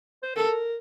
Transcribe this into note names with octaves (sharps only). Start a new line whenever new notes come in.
C5
A4 A#4